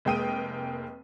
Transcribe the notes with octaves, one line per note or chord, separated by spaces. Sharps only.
F1 G#3 A#3 G5 D#6 D#7